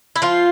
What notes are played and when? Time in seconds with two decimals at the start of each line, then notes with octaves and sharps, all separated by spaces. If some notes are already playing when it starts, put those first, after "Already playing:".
0.16 E4
0.22 F3 F4